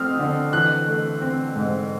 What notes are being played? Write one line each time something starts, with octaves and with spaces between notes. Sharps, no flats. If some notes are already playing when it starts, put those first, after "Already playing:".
Already playing: F3 A3 C4 D#6 F6
D3
E3 F#6
A3
C4
G#2